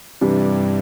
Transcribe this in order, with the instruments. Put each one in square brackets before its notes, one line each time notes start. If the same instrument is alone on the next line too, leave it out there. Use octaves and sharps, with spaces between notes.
[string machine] G2 [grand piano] C3 E3 G3 D4